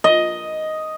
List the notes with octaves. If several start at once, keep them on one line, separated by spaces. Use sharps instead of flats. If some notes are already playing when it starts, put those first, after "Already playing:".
D#5